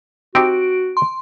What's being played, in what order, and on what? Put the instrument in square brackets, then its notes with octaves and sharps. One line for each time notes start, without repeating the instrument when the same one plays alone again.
[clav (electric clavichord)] C4 D#4 G4 [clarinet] F#4 [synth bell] D7
[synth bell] C6